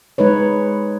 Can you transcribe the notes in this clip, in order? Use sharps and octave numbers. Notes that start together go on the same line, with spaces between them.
G#3 D#4 B4 C#5